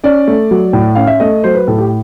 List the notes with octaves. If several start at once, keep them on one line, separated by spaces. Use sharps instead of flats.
C#4 D5
A3
F#3
A2
C#4 F5
E5
A3 D#5
F#3 C5
B4
A2 A4
G4